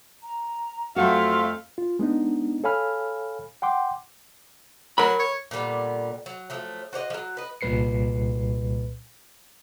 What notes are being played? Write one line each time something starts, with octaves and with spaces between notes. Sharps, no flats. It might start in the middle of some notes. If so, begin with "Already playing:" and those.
A#5
F2 F#3 A3 F#4 E5 F5 C6
F4
G#3 B3 D4 D#4
A4 C#5 F5 G#5 B5 F6
F#5 G5 C6 D6
F#3 A#4 B5
C#5
A#2 D3 G3 B3
F#3
F3 F#3 A3
F#4 C5 C#5 D#5
F3 F#3
B4 D#5
C2 A#2 G3 B4 C7 C#7